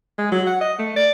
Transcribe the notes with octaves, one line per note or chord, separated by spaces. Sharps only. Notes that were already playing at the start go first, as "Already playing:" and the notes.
G#3
F#3
F#5
D#5
A3
D5